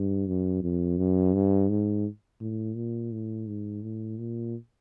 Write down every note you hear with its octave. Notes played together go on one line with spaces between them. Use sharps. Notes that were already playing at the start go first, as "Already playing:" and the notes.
Already playing: G2
F#2
F2
F#2
G2
G#2
A2
A#2
A2
G#2
A2
A#2